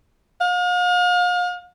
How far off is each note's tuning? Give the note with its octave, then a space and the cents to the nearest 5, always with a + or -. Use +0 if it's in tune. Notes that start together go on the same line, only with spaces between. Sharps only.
F5 +40